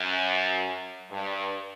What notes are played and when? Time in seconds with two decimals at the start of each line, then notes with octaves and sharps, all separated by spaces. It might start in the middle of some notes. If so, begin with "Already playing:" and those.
Already playing: F#2
1.11 G2